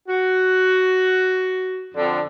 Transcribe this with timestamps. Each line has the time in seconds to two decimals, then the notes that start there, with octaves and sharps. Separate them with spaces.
0.09 F#4
1.95 F2 D3